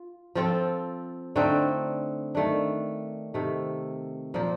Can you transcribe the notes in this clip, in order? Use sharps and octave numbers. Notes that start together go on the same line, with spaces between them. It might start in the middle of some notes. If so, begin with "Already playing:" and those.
Already playing: F4
F3 C4 F4 A4
D3 A3 C4 D#4
D#3 A3 D4
C3 D#3 A3
A#2 F3 A#3